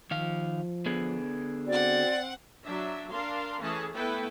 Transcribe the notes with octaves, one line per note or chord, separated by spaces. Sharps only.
D#3 F3 F5
D3 B3 G#4
C4 F#4 D5 F#5
F#3 D4 E5
D4 A#4 F5 C6
E3 A3 C#4 G#4 A5
A3 B3 E4 A4 B4 G5